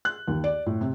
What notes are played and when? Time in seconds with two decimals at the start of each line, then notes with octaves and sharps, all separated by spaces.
0.05 F#6
0.28 D#2
0.44 D5
0.66 A2
0.81 C3